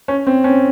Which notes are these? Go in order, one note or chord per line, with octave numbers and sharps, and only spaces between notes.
C#4
C4
C#4